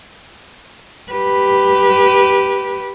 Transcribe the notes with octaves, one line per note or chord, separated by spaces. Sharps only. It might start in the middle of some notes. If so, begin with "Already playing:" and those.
G4 B4